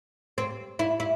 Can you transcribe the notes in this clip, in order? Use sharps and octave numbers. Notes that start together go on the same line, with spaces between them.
C4
E4
E4